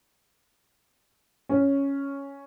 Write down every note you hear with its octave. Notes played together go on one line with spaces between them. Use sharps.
C#4